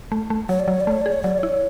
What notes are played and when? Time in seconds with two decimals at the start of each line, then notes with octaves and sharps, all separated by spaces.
0.12 A3
0.30 A3
0.49 F#3 C#5
0.60 D5
0.68 F#3 C#5
0.81 D5
0.87 A3 C#5
1.01 G#4 D5
1.12 C#5
1.23 F#3 D5
1.33 D5
1.38 C#5
1.43 E4